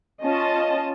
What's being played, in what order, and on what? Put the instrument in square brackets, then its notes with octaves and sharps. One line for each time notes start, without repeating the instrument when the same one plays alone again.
[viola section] C#4 F4 D#5 A5